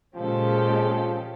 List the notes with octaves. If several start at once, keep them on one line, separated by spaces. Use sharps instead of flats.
A#2 C#3 F3 G#3 G4 A4